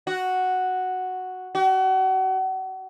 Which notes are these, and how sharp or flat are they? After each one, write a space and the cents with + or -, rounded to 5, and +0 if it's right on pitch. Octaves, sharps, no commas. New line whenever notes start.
F#4 +0
F#4 +35